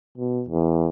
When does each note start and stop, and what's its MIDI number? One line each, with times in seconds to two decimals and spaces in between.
0.18 0.43 47
0.49 0.89 40